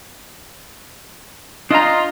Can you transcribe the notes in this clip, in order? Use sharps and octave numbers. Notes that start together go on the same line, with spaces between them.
D4 F4 D#5 A#5